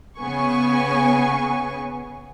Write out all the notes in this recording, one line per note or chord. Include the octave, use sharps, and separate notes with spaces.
C#3 B3 G#5 C#6